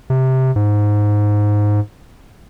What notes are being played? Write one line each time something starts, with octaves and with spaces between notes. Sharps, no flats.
C3
G#2